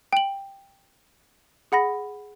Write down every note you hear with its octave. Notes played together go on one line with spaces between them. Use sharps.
G5 F#7
G#4 F#5 B5 A#6